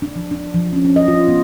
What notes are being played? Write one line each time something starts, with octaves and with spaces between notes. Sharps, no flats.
D4
F3
D4
F3
C#4
C#4
D#5
F4
B3